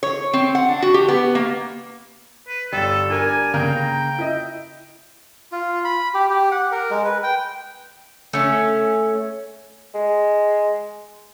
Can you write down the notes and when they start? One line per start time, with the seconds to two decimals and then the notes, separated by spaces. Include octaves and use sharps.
0.03 C#5
0.33 C4
0.55 F#5
0.69 D4
0.82 F#4
0.94 G4
1.08 B3
1.35 A#3
2.48 B4
2.73 G1 G3 A4
3.10 D4 A#4 D5 G#5
3.54 C#3 A#3 G5
4.19 E4 D#5
5.52 F4
5.85 B5
6.14 G4
6.30 G4
6.52 F#5
6.72 A#4
6.91 G#3
7.05 B4
7.23 G5
8.33 A3 C#4
9.95 G#3